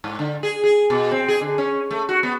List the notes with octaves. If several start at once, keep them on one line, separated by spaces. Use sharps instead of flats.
G#2
D3
G#4
G#4
B2
C4
G#4
D3
C#4
A3
F#4
B3